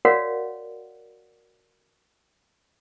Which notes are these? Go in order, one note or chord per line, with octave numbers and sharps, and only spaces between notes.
F#4 A#4 C#5 D5 F5 F#5